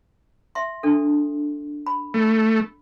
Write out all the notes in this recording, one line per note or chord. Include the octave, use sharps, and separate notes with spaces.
E5 C6
D4 A4
B5
A3